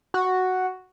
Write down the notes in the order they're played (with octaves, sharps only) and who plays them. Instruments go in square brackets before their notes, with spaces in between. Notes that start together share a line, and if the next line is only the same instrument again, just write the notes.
[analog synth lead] F#4